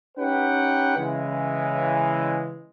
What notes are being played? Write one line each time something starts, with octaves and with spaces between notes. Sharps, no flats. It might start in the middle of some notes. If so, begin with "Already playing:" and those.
C#4 D#4 G4 B4 F#5 G5
C#3 E3 G#3